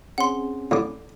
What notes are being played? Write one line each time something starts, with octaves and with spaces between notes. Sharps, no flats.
C4 C#4 G#4 F#5 C6
A2 D3 D6